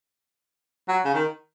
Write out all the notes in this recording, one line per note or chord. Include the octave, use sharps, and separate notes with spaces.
F#3
C#3
D#3